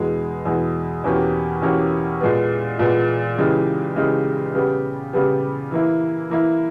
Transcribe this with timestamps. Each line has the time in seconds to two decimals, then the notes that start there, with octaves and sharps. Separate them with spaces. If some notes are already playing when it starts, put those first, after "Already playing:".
Already playing: E2 B2 G#3
0.45 E2 B2 G#3
1.04 E2 B2 A#3 C#4 G4
1.62 E2 B2 A#3 C#4 G4
2.21 A#2 G#3 B3
2.79 A#2 G#3 B3
3.38 C#3 E3 G#3 D#4 G4
3.96 C#3 E3 G#3 D#4 G4
4.55 C#3 G3 B3 G4
5.13 C#3 G3 B3 G4
5.71 E3 A#3 E4
6.30 E3 A#3 E4